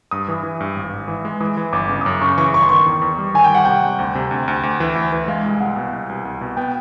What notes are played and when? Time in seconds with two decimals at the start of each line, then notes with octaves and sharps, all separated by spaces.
0.11 G2 D#6
0.28 E3
0.43 E3
0.60 G2
0.76 G#1
0.93 G#1
1.08 E3
1.25 G#3
1.40 E3 D#6
1.57 E3
1.73 G1 D6
1.89 C#3
2.01 D#6
2.05 F#2 D6
2.21 C#3 C#6
2.38 E3 C#6
2.53 G1 C#6
2.62 C6
2.69 D#3 C#6
2.86 E2
3.02 E2
3.18 G3
3.34 D#3 G#5
3.44 G5
3.50 G3 F#5
3.65 C3 G5
3.82 G3
3.99 D2
4.15 C3
4.31 D2
4.48 D2
4.63 D2
4.80 E3
4.95 D2
5.13 E3
5.28 G#3 F5
5.44 C2
5.60 C2 F#5
5.76 B2
5.93 C2
6.09 C2
6.25 C2
6.41 B2
6.57 B3 G5